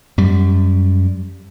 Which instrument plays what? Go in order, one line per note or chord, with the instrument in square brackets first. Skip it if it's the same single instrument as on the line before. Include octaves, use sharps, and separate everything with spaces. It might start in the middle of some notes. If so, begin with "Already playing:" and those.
[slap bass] F#2 G3